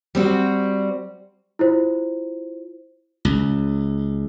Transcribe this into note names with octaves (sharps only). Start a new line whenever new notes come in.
G3 C4 F#4
E4 F4 C5
C#2